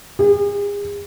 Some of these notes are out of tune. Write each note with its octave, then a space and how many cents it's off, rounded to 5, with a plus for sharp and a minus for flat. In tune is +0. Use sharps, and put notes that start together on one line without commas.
G#4 -40